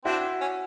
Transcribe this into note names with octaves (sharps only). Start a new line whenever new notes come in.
C4 D4 E4 F#4
C#4